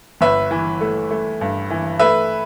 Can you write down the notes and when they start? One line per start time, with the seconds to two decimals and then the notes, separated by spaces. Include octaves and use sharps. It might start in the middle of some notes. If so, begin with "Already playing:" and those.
0.21 G1 B4 E5
0.51 E3
0.81 A3
1.11 A3
1.41 G2
1.70 E3
1.99 A3 B4 E5